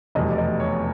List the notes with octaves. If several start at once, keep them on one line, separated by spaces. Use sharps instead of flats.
F1 E2 B2 G3 B3 D#5
D5
D#5
C#5